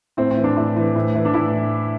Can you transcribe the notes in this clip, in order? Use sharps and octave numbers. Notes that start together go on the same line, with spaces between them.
A2 C4
C4
E3
D4
A2
E3
A2
E3
D4
A2 E4